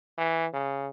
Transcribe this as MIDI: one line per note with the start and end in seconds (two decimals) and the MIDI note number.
0.18 0.46 52
0.53 0.89 49